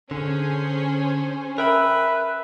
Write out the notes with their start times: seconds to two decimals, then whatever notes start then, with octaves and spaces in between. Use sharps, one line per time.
0.11 D3 C#4 G#4 C5
1.58 A#4 B4 E5 G5 B5